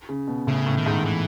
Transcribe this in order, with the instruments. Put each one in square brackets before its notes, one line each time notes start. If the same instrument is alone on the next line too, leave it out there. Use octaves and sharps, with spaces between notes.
[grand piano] C#3
B2
[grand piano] A2 [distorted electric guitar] C#3
[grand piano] A2
[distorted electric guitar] D#3
[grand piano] G#2
[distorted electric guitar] E3